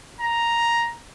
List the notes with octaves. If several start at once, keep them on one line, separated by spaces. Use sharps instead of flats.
A#5